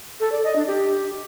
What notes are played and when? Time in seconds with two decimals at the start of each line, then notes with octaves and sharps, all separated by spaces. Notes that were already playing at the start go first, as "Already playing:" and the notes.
0.20 A4
0.32 D5
0.44 D#5
0.56 D4
0.68 G4